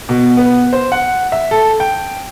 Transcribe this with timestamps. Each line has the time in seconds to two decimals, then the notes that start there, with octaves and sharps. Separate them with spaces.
0.09 B2
0.37 B3
0.73 C5
0.92 F#5
1.32 E5
1.51 A4
1.80 G5